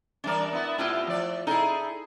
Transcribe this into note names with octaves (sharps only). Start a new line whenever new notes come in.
E3 G3 D4 A#4 D5
B3 E4
B2 A3 B3 E4 F4 G4
F3 D5
D#4 E4 G#4 A4